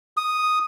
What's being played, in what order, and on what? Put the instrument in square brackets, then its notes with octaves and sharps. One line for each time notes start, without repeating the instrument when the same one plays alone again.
[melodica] D#6